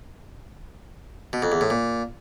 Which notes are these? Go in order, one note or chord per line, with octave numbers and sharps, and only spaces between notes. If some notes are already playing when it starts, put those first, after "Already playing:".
B2
F2
E2
A2
A#2